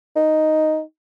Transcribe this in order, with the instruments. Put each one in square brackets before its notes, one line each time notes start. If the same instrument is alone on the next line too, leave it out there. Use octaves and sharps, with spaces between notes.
[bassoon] D#4